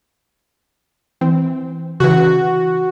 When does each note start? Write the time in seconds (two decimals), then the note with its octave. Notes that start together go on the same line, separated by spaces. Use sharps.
1.21 E3 C4
2.00 C#3 E3 F#4